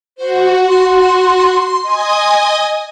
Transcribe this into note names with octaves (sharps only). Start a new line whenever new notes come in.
F#4 C5
C6
D#5 G#5 D#6